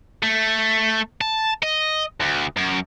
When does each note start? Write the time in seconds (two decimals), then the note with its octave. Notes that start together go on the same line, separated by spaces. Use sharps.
0.23 A3
1.21 A5
1.63 D#5
2.20 D2
2.57 F#2